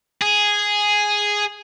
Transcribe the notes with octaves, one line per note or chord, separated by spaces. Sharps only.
G#4